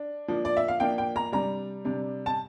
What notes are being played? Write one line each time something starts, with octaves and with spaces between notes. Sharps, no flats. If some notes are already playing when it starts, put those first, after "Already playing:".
Already playing: D4
F3 A#3 D4
D5
E5
F5
F3 A#3 D4 G5
G5
A#5
C3 G3 D4 A#5
C3 G3 D4
A5